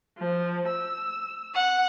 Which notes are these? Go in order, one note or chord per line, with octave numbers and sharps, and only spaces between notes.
F3
E6
F#5